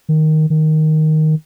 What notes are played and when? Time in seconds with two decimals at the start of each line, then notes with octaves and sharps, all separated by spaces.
0.09 D#3
0.50 D#3